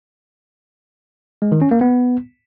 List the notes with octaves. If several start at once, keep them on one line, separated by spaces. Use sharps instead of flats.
G#3
D#3
C#4
A#3
B3